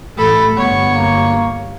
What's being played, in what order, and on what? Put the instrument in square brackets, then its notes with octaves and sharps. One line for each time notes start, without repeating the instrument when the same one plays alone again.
[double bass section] A1 A3 [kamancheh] A4 B5
[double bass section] G1 [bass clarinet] B3 [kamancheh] C#5
[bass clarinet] A#3